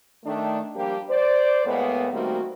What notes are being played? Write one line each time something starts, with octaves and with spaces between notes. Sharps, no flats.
D#3 A3 D4
F3 G3 A#3 D4 G4
C5 D5
A2 G#3 A#3 B3
D#3 G3 A3 A#3 C4 F#4